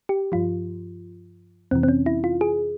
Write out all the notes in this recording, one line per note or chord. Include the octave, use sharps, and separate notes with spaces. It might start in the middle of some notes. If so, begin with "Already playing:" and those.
G4
G2 F3 F4
F2 C3 E3 C4
C4
C#4
E4
F4
G#4